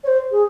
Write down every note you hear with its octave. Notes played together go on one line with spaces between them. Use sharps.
C#5
C5
G#4